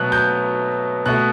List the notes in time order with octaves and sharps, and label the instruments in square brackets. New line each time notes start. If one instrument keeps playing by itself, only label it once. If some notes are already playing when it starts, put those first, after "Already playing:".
Already playing: [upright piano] B2 F#3 A3 F#6
G6
B2 A3 F#6